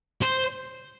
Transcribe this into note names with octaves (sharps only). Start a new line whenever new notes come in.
C5